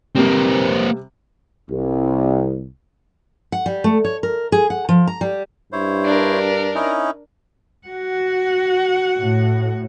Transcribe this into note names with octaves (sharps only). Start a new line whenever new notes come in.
C3 G3 A#3 C4
C2
F#5
G3
A3
C#5
A#4
G#4
F#5
F3
A#5
G3
G2 E4 C5 C#5
D4 A#4
C#4 D#4 E4
F#4 F#5
A2